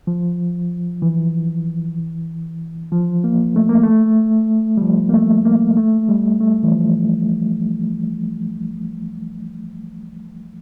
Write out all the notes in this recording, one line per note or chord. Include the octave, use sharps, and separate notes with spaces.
F3
E3
F3
A#3
A3
A#3
A3
G3
F3
A#3
A3
A#3
A3
G3
A3
E3
F3